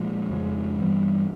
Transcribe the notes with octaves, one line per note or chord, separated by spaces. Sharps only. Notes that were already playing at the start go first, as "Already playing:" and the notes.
Already playing: A#2 F3 G#3
F2 C#3 F3 G#3
G2 E3 G3 B3